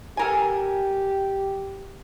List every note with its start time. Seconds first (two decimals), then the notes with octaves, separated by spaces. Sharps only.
0.17 G4 A4 A#4 G#5